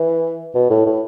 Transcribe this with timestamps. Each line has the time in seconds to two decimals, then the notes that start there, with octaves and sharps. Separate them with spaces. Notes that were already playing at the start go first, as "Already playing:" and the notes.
Already playing: E3
0.55 B2
0.70 A2
0.86 A2